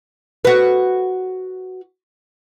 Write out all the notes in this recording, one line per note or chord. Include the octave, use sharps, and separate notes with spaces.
F#4 B4